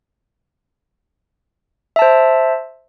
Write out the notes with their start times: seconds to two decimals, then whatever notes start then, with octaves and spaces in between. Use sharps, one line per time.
1.96 E5
1.99 A5
2.02 C5